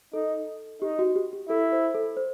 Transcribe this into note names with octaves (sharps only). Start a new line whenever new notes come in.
D#4 A4
D#4 G4
F#4
G4
G4
E4 A4
C5
A4
C5